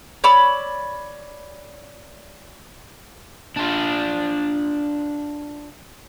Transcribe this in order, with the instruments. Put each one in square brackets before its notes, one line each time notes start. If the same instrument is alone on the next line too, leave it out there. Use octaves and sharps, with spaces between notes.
[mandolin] C#5 D5 B5 E6
[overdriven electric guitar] D4 F4